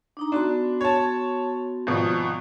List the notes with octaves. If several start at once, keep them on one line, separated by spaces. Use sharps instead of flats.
D4 D#4 A#5
B3 D4 F#4 C6
C#5 A5
G#1 B2 F3